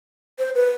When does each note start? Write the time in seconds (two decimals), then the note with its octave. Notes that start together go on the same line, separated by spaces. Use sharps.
0.39 C5
0.55 B4